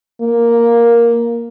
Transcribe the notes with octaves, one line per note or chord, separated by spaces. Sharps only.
A#3